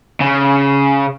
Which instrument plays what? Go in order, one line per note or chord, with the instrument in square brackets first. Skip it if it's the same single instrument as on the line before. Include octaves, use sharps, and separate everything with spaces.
[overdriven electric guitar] C#3